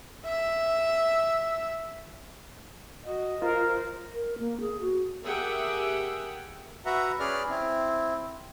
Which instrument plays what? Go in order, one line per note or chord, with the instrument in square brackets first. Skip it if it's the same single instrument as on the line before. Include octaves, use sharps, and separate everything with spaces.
[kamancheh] E5 E6
[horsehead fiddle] F#4 [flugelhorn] D#5
[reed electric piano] F4 [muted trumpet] A#4 [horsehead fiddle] C5
[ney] A#4
A#3
G#4
F#4
[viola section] G4 G#4 A#4 E5 F#5 G5
[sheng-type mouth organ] F#4 B4 E5 F#5 A#5
C#4 G#4 B4 D5 F6
C4 E4